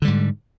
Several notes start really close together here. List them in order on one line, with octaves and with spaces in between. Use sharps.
D3 G3 G#2